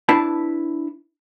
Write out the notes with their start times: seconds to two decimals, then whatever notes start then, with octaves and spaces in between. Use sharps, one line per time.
0.09 D4 E4 B4 A5